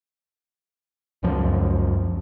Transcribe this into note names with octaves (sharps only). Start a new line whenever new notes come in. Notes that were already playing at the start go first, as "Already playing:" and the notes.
C#2 F#2 F3